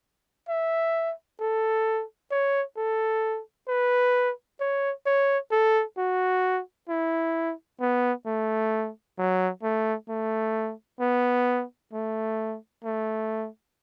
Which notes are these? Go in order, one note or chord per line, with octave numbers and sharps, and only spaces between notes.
E5
A4
C#5
A4
B4
C#5
C#5
A4
F#4
E4
B3
A3
F#3
A3
A3
B3
A3
A3